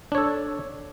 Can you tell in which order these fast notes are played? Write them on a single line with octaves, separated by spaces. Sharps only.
D4 C#5 A4